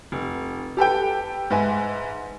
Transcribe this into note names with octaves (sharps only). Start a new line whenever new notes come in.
F1
G4 A4 B4 G5
G#2 B4 E5 G#5